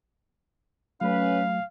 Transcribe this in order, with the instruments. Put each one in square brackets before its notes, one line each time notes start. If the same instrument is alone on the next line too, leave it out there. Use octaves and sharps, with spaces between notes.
[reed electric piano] F#3 A3 [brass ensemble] C#4 B4 [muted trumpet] F5